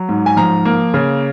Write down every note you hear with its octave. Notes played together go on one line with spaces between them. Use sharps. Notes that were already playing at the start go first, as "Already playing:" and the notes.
Already playing: F#3
G#2
G#5
F3 A#5
A#3
C#3